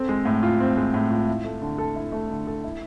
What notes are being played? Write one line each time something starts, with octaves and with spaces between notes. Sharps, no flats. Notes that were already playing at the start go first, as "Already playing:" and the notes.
Already playing: C4 A4
G#3
A2
F4
C4
G#3
A2
F4
E4
A3
D3
A4
E4
A3
D3
A4
E4